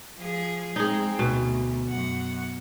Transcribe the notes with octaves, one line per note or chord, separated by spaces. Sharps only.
F3 G#4
G#3 C4 D#4 G#4
D2 B2
F#2 F#5